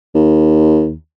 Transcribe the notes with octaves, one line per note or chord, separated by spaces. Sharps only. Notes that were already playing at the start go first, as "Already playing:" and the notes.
D#2